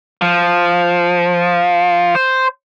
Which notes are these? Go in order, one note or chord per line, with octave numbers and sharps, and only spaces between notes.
F3
C5